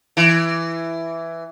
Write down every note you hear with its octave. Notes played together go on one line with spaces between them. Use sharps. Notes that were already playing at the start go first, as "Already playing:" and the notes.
E3